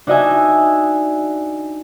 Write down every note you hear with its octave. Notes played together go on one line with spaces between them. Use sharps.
D4 D#4 F#4 D#5 E5 G#5